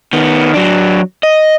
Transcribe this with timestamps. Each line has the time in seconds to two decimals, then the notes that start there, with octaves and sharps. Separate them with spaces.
0.13 D#3 B3
0.54 F#3 D4
1.23 D#5